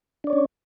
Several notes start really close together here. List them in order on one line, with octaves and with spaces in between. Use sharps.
D4 D5 C#5 C#4